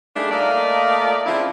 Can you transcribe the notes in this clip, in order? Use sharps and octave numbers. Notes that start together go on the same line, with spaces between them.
G3 A3 A#3 D4 D#4 G#4
A#2 A3 A#4 D5 D#5 F5
C#3 F3 C4 E4